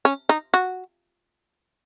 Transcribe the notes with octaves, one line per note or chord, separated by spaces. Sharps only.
C#4
D#4
F#4